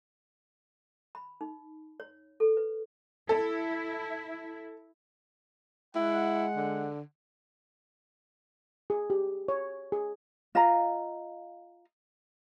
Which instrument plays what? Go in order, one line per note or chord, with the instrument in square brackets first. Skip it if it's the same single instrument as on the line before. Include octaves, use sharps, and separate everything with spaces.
[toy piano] B5
D#4
C#5
A4
B4
[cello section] E4 [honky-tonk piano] A4
[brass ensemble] G#3 F#5 [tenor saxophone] E4
[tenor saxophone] D3
[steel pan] G#4
G4
C#5
G#4
[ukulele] F4 D#5 F5 A#5